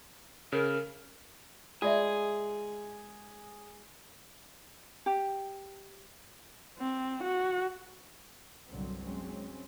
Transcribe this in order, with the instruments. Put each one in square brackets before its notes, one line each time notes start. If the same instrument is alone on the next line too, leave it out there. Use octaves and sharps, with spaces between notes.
[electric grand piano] C#3 [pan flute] A#4
[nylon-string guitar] G#3 [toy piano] F4 D5 E5 [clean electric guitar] G#4
[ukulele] G4
[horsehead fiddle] C4
F#4
[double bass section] G1 C2 A#2 D3 F#3 C4
F#3 G#3 C4 C#4